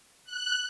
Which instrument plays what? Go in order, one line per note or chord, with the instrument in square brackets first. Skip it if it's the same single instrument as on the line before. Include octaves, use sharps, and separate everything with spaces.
[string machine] F#6